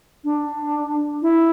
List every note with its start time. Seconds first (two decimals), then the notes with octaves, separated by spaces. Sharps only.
0.24 D4
1.22 E4